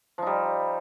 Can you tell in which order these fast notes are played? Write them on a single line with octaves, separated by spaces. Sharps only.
F3 D#4 G3